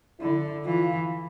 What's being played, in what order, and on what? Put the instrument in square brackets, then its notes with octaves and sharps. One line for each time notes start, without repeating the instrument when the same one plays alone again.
[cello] D3 [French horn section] E4
[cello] E3 [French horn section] F4